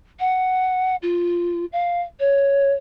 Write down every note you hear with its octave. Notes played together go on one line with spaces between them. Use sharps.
F#5
F4
F5
C#5